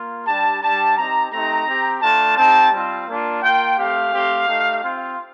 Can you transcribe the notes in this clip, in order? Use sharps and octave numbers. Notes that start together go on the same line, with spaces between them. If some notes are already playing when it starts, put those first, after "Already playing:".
Already playing: A#3 F4
G3 D4 G4 A5
G3 D4 G4 A5
C4 D#4 G4 A#5
A3 C4 D#4 G4 A#5
C4 G4
A3 D4 F4 A5
C4 D#4 G4 A5
G3 C4 F4
A#3 D4 F4
A#3 F4 G5
A3 C4 G4 F5
A3 C4 G4
A3 D#4 G4
C4 F4